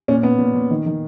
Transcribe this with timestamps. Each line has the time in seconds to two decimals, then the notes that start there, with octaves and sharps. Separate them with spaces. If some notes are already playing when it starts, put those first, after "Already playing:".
0.08 A#2 C#4
0.23 A#2 B3
0.39 A#2
0.54 A#2
0.70 D#3
0.86 D#3